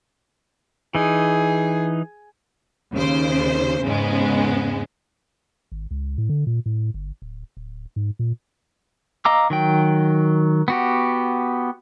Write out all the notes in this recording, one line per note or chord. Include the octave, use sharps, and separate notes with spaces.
E3 D#4 G#4
D#2 C#3 C5
E2 G#2 C#3 G#3 B3
G#1
C#2
A2
D3
A#2
A2
G1
D1
D1
G#2
A#2
D#5 F5 A#5 D6 E6
D#3 F#3 G5
B3 F#4 G4